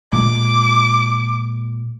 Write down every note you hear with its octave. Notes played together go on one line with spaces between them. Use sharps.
A#2 G#3 D6